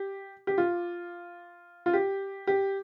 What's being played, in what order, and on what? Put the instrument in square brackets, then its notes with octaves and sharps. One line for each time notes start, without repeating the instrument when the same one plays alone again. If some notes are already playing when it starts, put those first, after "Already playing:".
Already playing: [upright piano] G4
G4
F4
F4
G4
G4